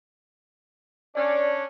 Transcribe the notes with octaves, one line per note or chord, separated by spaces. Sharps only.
C#4 D4 D5